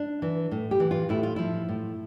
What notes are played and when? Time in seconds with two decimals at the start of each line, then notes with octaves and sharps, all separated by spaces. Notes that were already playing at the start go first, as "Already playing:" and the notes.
Already playing: D4
0.22 E3
0.51 A2
0.71 G4
0.80 E3
0.91 F4
1.09 A2 E4
1.23 F4
1.36 F3 E4
1.69 A2